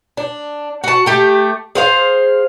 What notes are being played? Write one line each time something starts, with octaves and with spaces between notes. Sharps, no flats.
D4
F#4 A5
A3 G4
G#4 C5 F5